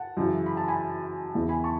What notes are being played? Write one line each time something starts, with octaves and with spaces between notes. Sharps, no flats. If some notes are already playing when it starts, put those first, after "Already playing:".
Already playing: F#5 A5
F#2 C#3 E3
B5
A5
G#5 B5
E2 C#3 E3
G#5 B5
A5 C#6